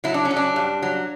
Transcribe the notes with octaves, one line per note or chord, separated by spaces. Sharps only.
F#3 E4
D4
C#4
F#3
D4
G2
F#3